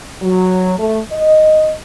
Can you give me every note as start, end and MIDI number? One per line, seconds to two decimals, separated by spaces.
0.22 0.74 54
0.78 1.00 57
1.12 1.72 75